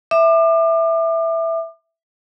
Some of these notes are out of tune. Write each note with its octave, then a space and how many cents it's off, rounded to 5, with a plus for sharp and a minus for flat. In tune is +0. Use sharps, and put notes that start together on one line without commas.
E5 +0 D6 +35